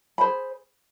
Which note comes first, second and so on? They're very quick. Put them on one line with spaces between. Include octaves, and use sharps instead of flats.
B5 C5 G#4